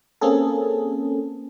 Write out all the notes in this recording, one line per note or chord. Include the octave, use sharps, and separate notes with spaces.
A#3 C4 C#4 G#4 A4